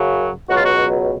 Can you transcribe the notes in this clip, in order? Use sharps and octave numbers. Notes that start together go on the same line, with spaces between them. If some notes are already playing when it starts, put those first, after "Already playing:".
Already playing: F#2 C#3 F#3
C#2 B2 F#3 F#4
F4
F#4